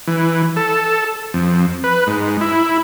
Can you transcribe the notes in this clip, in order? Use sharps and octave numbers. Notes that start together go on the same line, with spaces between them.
E3
A4
F2
B4
G#2
E4